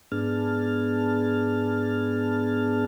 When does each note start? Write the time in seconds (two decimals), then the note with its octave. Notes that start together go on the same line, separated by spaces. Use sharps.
0.12 G#2 B3 D4 G#4 A5 F6